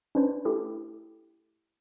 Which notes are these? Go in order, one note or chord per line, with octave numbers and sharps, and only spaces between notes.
C#4 D4 B4 C5
A3 E4 G4 A4